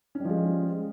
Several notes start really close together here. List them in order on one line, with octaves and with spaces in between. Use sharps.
C#4 G3 F3 G#3